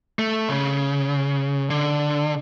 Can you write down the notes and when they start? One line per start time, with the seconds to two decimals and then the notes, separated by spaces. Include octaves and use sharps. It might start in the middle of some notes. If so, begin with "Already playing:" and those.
0.19 A3
0.49 C#3
1.70 D3